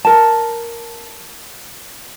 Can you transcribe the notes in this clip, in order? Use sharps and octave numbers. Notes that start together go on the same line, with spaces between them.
A#4 A5